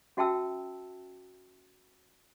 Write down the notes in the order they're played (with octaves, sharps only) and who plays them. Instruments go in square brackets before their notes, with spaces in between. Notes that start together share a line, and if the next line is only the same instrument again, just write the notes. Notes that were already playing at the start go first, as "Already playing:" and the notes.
[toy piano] C#4 F#4 E5 G5 A5 E6